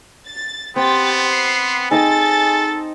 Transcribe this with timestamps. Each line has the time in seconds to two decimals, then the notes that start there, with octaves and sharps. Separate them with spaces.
0.28 A6
0.76 B3 C4 G4 G5 A6
1.31 C7
1.91 D#4 G#4 A4 D#5 G5 A6